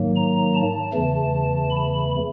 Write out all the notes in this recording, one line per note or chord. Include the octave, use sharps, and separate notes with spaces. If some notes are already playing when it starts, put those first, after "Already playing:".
Already playing: G#2 D#3 F#3 A#3
A#5
A5
E2 C#3 E3 A3
B5